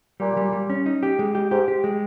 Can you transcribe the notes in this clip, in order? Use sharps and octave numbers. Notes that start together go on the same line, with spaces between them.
A#2 G3
G3
G3
C#4
D#4
G4
G#3
G4
G#2 G4
G4
G#3